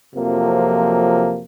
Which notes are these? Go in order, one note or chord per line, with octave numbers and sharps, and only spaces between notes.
F2 C3 F3 F#3 A#3